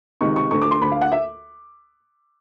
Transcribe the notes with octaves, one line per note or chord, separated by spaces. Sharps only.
C#2 C3 D#3 C#6
C#6
D2 D3 C#6
D6
C6
D2 D3 B5
F5
F#5
E5